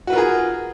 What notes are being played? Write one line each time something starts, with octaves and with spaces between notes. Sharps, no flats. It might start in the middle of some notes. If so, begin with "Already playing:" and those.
F4 F#4 G#4 A#4 B4